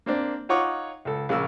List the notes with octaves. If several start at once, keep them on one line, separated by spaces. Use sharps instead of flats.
A#3 C4 D4
D#4 F4 C#5 F#5 C#6 D6
C#2 A4
A#1 C#3 A#4 E6